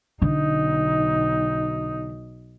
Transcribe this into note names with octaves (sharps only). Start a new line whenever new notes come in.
B1 D3 D#4